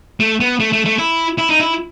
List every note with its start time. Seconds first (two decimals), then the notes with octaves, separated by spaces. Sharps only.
0.20 A3
0.40 B3
0.60 A3
0.73 A3
0.85 A3
0.99 E4
1.38 E4
1.49 D#4
1.60 E4